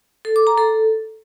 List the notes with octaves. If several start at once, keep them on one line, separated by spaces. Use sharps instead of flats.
A4
D6
A#5
A4